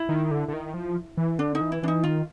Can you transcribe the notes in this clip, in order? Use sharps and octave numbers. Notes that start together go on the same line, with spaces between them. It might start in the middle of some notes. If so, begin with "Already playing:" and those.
Already playing: E4
D#3
D3
D3
D#3
F3
E3
D3 D4
D#4
E3
E4
E3 D4
D#4
D#3 F4